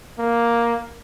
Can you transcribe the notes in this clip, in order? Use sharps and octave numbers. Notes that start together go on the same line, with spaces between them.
A#3